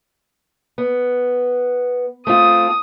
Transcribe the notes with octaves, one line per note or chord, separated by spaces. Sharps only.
B3
A3 C4 F4 D#6